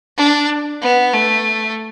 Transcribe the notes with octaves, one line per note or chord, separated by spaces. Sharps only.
D4
B3
A3